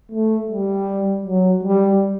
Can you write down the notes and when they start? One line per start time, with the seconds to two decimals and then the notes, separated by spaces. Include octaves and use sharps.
0.11 A3
0.50 G3
1.25 F#3
1.63 G3